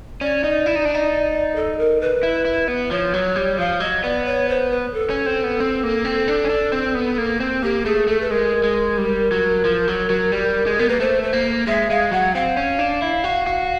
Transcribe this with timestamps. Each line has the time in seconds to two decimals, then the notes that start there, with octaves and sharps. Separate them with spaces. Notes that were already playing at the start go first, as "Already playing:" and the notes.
0.21 C#4 D5
0.44 D#4
0.66 E4
0.76 D#4
0.85 D4
0.95 D#4
1.55 A4
1.78 A#4
2.01 B4
2.23 E4
2.45 E4
2.68 B3
2.90 F3 C#5
3.14 F#3
3.36 G3
3.58 F3 F5
3.80 F#3 D#5
4.03 B3 D5
4.25 C#5
4.49 C5
4.70 B4
4.93 A4
5.10 C#4
5.26 C4
5.44 B3
5.60 C4
5.83 A#3
6.05 C4
6.28 D4
6.44 C#4
6.50 D4
6.72 C4
6.95 B3
7.18 A#3
7.40 C4
7.62 A#3 G4
7.85 A3 G#4
8.08 A3 A4
8.20 B4
8.30 G#3 A#4
8.64 G#3
8.97 G3
9.32 F#3
9.65 F3
9.88 F#3
10.10 F#3
10.32 G3
10.66 G#3
10.77 B3 A#4
10.88 A#3 B4
11.00 A3 C5
11.23 C5
11.33 A#3
11.67 G#3 E5
11.90 G#3 F5
12.11 F#3 F#5
12.34 C4 F5
12.57 C#4
12.79 D4
13.02 E4
13.24 F#4
13.47 F#4